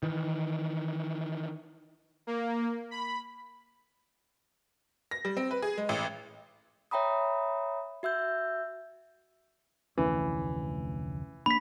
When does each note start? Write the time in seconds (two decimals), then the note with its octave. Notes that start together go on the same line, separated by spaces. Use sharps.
0.03 D#3 E3
2.27 A#3
2.91 B5
5.11 A#6
5.25 G3
5.37 C4
5.51 B4
5.62 G#4
5.78 G#3
5.89 A1
6.91 C#5 E5 G5 A#5 B5 D#6
8.03 F#4 E5 E6 G6
9.98 F1 D2 E3 C#4
11.46 A#3 D4 B5 B6